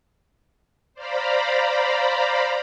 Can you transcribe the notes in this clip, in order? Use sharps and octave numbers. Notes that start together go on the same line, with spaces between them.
C5 D5 F5 A#5 B5